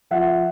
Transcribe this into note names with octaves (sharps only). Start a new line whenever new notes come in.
F3 E5 F#5